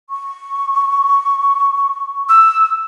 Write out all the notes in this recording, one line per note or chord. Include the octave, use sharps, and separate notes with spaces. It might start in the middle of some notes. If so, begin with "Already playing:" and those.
C#6
E6